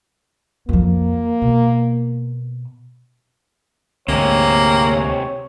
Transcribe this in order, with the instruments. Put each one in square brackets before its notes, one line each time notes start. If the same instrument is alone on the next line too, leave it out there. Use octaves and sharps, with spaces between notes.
[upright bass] F2 F3 [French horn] A#3
[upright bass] B2
[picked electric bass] D2 G#2 [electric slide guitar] C3 G#3 C4 [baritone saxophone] A#3 [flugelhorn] C#5